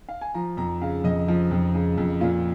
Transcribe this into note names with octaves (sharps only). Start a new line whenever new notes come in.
F5
G#5
F3 A#5
F2 A#5
C#3 F5
F2 D#5
F3
F2
C#3
F2
A#2 F4